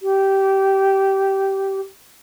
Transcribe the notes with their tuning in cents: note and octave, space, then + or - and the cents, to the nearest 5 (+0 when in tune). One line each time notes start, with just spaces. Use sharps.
G4 -15